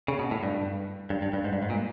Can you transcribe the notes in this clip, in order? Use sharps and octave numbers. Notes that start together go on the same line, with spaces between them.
C#3
B2
A2
G2
G2
G2
G2
G#2
G2
G#2
A#2